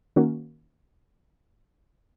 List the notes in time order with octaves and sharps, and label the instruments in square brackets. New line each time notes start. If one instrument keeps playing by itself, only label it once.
[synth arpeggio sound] D#3 A#3 C#4 F#4